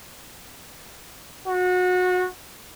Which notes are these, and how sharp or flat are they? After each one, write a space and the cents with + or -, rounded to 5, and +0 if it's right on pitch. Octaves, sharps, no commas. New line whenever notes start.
F#4 -25